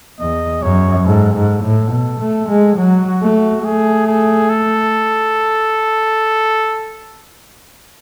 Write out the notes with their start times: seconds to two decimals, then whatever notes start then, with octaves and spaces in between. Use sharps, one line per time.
0.20 E2 D#5
0.63 F#2 C#5
1.06 G#2 A4
1.34 G#2
1.63 A2
1.92 B2
2.21 A3
2.49 G#3
2.77 F#3 F#4
3.07 F#4
3.22 A3
3.36 F#4
3.64 A3 G#4
4.07 G#4
4.50 A4